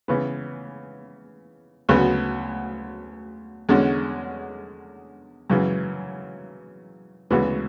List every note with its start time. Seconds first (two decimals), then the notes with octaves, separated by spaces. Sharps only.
0.08 C#3 E3 B3
1.89 D2 C#3 F#3 B3 F#4
3.69 E2 D3 G#3 C#4 F#4
5.50 F#2 C#3 E3
7.30 D2 C#3 E3 B3 F#4